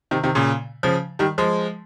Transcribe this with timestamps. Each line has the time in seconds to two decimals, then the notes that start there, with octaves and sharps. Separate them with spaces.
0.11 C3 D#3
0.23 C3 D#3
0.35 A#2 C#3
0.83 C#3 F3
1.19 D#3 G3
1.38 F3 G#3